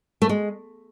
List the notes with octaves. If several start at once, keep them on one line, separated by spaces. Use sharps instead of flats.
A3
G#3